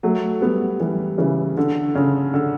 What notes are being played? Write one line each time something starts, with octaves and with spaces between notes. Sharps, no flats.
F#3 A3
G3 B3
E3 G3
C#3 E3
D3
C#3
D3